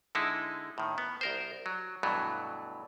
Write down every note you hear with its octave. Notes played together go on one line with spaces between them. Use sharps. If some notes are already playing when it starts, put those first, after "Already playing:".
D3 G#3 D#4 E4
A2 D#3
B3
C2 A#4 C5
F#3
G2 B2 E3 F#3 A3